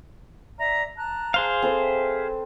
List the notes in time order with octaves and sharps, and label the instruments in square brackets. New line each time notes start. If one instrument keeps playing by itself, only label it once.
[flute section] D5 E5 A#5
A5 A#5 F#6
[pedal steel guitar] G#4 C5 F5
[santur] C4 A4 B4
[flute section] E5